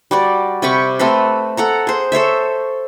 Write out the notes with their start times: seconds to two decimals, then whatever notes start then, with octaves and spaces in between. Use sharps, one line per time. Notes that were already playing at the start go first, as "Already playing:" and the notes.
0.11 G3 F#4 D5
0.62 C3 G4 B5 C#6
0.99 A3 C4 A4 B4
1.57 A4 F#5 A#5
1.87 G#4 C5
2.12 A4 C5 C#5 E5